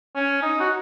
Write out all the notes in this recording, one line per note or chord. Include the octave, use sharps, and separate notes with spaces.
C#4
D#4
F#4